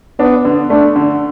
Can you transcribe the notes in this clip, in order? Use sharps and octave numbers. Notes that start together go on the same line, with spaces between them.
B3 D4
D3
A3 D4
D3